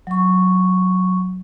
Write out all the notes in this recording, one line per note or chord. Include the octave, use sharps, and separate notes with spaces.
F#3 C#6